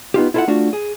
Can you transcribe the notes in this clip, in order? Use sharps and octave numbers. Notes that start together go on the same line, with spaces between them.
B3 D#4 F4 G4
E4 F4 A4 C5 E5 F#5
A3 D4 F4 F#4
G#4